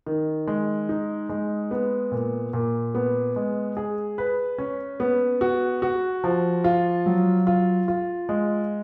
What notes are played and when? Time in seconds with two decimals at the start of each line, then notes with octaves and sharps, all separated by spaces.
0.06 D#3
0.47 G#3
0.89 D#4
1.29 G#3
1.71 B3
2.12 A#2
2.53 A#2
2.95 B3
3.36 G#3
3.77 G#4
4.18 B4
4.58 C#4
5.00 B3
5.41 F#4
5.82 F#4
6.24 F3
6.64 F4
7.06 F#3
7.47 F4
7.88 F4
8.29 G#3